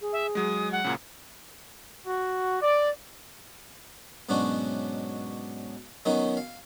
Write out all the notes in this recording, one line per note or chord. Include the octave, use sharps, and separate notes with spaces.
G#4
E5
F#3 G#3 D#6
F#5
F#2 A#2 C#3
F#4
D5
G#2 B2 F#3 C#4 D4 F#4
D#3 F#3 B3 C#4 D#4
F5